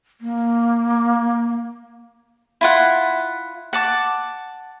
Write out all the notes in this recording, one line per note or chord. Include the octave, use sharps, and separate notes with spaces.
A#3
E4 F4 F#5
F#5 A5 D6